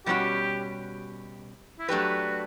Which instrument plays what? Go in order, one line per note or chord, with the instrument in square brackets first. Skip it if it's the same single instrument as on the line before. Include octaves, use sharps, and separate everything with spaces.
[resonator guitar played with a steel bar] B2 G3 C#4 F#4 [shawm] G4
[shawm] E4
[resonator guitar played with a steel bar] F#3 A3 D4 G4 B4 [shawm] F#4